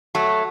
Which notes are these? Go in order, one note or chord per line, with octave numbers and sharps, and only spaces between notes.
F#3 A3